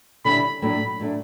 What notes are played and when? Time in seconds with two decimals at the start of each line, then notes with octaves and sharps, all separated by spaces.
0.25 D3 G3 C#4 E4 B5
0.62 A2 F#3 A3 D4 B5
1.00 A2 F#3 A3 D4